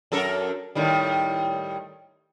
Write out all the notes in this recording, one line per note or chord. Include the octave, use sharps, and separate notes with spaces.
F#2 A4 A#4
A2 D#3 G3